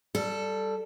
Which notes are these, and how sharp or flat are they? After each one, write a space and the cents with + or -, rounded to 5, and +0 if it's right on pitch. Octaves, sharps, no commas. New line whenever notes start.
G3 +0 A4 +0